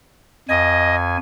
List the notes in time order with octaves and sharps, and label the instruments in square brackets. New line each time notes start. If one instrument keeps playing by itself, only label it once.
[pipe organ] F2 G#5 [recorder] D#5